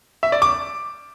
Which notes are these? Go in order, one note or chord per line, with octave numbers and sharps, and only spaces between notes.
E5
D5
D6